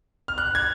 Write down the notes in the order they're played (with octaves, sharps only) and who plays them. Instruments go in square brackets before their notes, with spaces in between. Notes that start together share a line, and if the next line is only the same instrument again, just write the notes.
[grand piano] F6
F#6
G#6